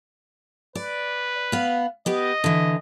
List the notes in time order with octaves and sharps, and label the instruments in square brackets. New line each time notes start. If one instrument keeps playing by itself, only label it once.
[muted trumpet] B4 [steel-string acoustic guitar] D5
[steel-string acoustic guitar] B3 F5
[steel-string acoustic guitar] B3 G4 B4 [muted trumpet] D#5
[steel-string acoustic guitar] D3 E3